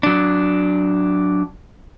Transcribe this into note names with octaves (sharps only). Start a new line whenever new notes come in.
F#3 D4